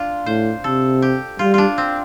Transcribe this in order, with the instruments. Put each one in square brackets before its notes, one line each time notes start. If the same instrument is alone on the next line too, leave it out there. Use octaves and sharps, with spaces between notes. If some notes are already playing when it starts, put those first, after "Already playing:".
Already playing: [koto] D4 F4
[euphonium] A2 [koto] C5
[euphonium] C3 [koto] A4
[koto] G4
[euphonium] G3 [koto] F4
[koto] D4 F4
C4